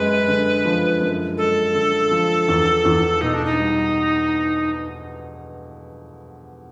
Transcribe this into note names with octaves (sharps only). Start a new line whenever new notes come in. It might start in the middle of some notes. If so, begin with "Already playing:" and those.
Already playing: F#2 G#3 B4
D3
F3
F#2
G#3 A4
D3
F3
E2
E2
B2 D#4
D4
D#4
G3